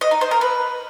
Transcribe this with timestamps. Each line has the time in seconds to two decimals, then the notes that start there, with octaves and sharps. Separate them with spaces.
0.01 D#5
0.11 D#4
0.21 C5
0.31 A#4
0.41 B4